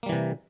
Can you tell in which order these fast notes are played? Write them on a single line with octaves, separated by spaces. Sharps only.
A#3 G3 E3 C3